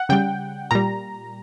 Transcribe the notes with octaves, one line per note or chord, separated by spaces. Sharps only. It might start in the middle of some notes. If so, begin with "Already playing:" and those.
Already playing: F#5
C#3 G3 G5
A#2 G3 A#5